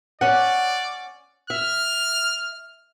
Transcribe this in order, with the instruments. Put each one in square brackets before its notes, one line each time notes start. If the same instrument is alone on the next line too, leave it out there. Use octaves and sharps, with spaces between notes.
[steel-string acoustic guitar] C#4 F#5 [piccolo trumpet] D5
[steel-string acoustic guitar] E5 [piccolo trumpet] F6